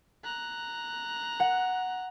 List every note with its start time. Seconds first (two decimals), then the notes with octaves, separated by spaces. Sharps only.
0.24 A#5 F#6
1.40 F#5